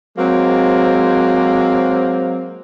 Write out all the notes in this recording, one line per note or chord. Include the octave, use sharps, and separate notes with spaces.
F#3 G#3 A#3 C4